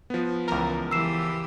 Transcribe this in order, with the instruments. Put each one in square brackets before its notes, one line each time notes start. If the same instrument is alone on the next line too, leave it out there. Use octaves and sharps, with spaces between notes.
[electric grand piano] F3 B3
[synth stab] C#2 A#4 [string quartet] E3
[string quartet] E3 G4 [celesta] E6 C7 E7